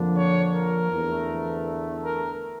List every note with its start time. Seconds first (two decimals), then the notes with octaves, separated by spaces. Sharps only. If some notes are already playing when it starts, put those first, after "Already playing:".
Already playing: F2 D3 F3 A#3 D4
0.16 C#5
0.54 A#4
0.92 E2 D3 A3
2.04 A#4